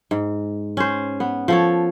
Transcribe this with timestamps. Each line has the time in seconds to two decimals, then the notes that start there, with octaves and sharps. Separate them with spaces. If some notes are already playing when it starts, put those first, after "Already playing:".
0.11 G#2
0.77 C#4 C5
1.20 B3
1.48 F3 A4 C#5